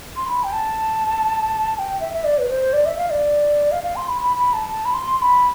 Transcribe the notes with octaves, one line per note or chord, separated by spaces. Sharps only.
C6
B5
G5
A5
A5
G5
E5
E5
D5
B4
C5
D5
E5
F5
D5
F5
F5
C6
B5
B5
B5
A5
A5
B5
C6
C6
B5